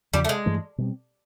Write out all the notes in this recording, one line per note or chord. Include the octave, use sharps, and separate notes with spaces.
E2 C#3 F3 G3
A3
G#3
G2 E3 A3
B2 G3 C4